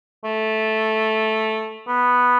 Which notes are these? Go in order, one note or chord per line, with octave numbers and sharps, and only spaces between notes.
A3
B3